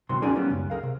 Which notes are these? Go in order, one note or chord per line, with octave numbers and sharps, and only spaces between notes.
C#2 C3 D#3 F#3 C4 C6
C#4 D#4 F#4 G#4 A#4 D5
F#3 A#3 B3 C#4 D#4 G4
C#2 F#2
G#4 A#4 F5
C3